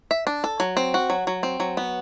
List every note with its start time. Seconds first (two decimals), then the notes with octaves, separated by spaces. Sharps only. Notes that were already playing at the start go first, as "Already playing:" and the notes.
0.11 E5
0.27 D4
0.44 A4
0.60 F#3
0.77 C4
0.94 F#4
1.10 F#3
1.27 F#3
1.43 C4
1.60 F#3
1.77 B3